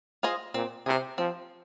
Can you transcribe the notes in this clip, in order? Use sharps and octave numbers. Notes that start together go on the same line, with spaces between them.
F4 G#4 C5 D#5
A#2 C4
C3 G#4 C5
F3 C4